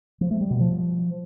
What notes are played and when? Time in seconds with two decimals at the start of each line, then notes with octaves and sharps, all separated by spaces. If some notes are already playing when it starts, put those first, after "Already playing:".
0.21 F3
0.31 A3
0.41 G3
0.51 B2
0.60 F3